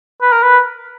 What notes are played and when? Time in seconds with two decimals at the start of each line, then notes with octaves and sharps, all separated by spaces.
0.22 B4
0.32 A#4
0.43 B4